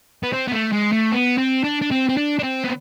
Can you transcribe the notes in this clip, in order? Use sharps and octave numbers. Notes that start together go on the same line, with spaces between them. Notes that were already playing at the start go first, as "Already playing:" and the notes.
B3
C4
B3
A3
G#3
A3
B3
C4
D4
D4
C4
C4
D4
D4
C4
B3